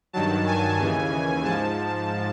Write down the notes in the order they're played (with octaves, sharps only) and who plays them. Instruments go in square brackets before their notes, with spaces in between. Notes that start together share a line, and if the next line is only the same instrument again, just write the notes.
[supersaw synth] G2 D#3 F#3 A5
G#5
D#2 C#3 E3
G#2 F3 A5